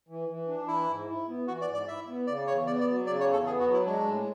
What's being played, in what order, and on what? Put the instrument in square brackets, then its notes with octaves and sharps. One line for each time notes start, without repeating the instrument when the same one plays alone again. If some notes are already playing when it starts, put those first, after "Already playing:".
[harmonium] E3
E3
D4
[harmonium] E3 [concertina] E4
[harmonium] G#2
E4
B3
[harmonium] E3 [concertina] F#4
[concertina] D5
[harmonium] G#2
[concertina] D5
[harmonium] E4 [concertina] E5
[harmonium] B3
[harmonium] C#3 [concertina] D5
[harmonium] E2 [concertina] C#5
[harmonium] B3 [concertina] D5
[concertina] D5
[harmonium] F#3
[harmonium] C#3 [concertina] D5
[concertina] C#5
[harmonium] E2
[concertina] A4
[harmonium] B3 [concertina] G#4
[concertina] F#4
[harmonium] F#3
[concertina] E4
[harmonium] G#3 [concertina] D4
[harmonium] A2